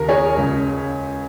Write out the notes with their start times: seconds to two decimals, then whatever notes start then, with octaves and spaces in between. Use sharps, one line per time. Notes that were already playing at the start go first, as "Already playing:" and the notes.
Already playing: D#2 C#3 A#4
0.09 G#4 C#5
0.37 C#2 C#3